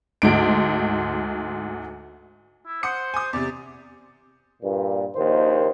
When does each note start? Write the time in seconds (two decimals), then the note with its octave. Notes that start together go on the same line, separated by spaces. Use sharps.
0.22 D2 G#2 D7
2.67 E4
2.83 C5 F#5 D#6 C#7
3.14 G#5 D#6
3.33 E2 C3 D5
4.62 G2 A#2
5.16 A#1 D#2 D#3 C5